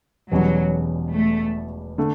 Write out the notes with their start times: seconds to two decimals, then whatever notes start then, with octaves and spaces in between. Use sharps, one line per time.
0.31 E1 E2 B2 F#3 G3 C#4
1.14 A3
1.98 D3 A3